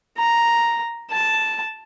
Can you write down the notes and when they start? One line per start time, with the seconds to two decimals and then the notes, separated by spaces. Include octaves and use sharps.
0.18 A#5
1.11 A5